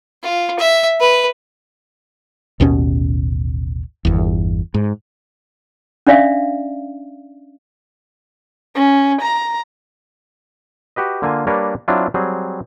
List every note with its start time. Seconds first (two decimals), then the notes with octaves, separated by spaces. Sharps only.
0.23 F4
0.59 E5
1.00 B4
2.60 A1 D#2 B2 C#4
4.05 G1 E2
4.74 G#2
6.07 C#4 D4 D5 E5 F5
8.75 C#4
9.22 A#5
10.96 F#4 G4 B4 D#5
11.22 D3 A#3 F4 G#5
11.47 G3 A#3 D4 A#4 B4 C#5
11.88 F#3 C4 D4 E4 F4
12.14 F#3 G3 C4 G#4